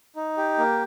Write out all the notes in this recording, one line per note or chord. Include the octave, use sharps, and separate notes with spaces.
D#4
G4
A#3